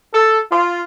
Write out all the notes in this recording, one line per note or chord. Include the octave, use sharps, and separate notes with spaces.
A4
F4